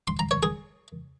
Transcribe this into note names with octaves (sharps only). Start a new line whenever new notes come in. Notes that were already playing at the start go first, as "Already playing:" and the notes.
C6
A#5
C#5
G#4